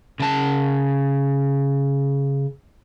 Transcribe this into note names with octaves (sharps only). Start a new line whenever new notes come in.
C#3 A5